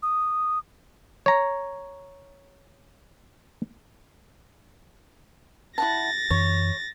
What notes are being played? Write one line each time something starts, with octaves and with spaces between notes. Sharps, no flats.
D#6
C#5 A#5
E4 F#5 A5 A6 A#6
F#2 E3 C#5